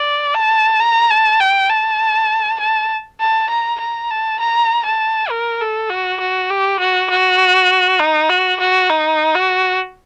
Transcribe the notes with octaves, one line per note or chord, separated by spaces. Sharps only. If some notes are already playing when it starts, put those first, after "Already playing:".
Already playing: D5
A5
A#5
A5
G5
A5
A5
A5
A#5
A#5
A5
A#5
A5
A#4
A4
F#4
F#4
G4
F#4
F#4
D#4
F#4
F#4
D#4
F#4